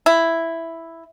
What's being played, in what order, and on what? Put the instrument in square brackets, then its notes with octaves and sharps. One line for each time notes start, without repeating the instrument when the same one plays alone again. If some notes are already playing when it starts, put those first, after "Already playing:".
[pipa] E4